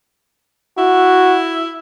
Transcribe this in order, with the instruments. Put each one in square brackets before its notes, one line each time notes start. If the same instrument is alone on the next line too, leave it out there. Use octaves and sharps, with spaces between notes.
[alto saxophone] E4 [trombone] F#4